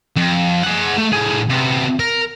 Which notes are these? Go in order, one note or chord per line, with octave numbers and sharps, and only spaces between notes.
F2
G#4 F#5
A3
A2 G#4
C3 B3
A#4